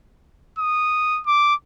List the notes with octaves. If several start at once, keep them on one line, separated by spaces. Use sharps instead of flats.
D#6
D6